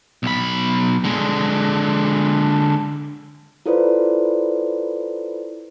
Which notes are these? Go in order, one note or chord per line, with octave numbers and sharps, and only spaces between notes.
B1 B5
D3 G#3
E4 F4 A4 B4 C5 D5